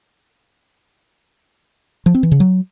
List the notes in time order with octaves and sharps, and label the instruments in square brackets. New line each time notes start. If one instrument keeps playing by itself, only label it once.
[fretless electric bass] F3
C4
E3
C#3
F#3